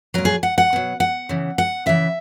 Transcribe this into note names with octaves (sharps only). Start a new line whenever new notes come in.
A#2 F#3 A#4
G#4
F#5
F#5
B2 F#3
F#5
C#3 E3
F#5
C#3 E3 E5